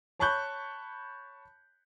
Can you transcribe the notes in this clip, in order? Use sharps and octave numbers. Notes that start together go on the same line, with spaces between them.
C#5 A5 B5 C#6 F#6 G6